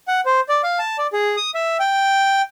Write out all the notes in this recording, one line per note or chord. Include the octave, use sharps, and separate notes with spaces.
F#5
C5
D5
F5
A5
D5
G#4
D#6
E5
G5